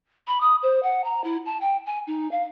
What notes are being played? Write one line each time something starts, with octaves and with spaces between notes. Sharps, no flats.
B5
D#6
C5
F#5
A#5
E4
A5
G5
G#5
D#4
F5